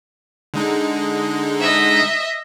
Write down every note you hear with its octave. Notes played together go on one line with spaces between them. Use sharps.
D3 G#3 D#4
D#5 E5